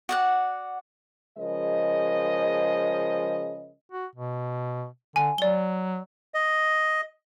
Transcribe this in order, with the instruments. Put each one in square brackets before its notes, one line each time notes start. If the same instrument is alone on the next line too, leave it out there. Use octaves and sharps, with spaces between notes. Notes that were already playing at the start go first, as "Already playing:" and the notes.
[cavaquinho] F#4 D5 F#5
[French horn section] C#3 F3 G#3 A#4 D#5
[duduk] F#4
B2
[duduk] D3 [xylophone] G#5
[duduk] F#3 [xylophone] D5 G7
[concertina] D#5